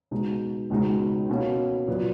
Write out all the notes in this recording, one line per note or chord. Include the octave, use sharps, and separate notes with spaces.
B2 G#3 D#4
C#2 B2 G#3 D#4
B2 A#3 C#4
A#2 F#3 B3